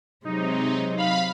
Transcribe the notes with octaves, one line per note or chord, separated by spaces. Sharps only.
C3 F#3 G#3 D#4
F5 B5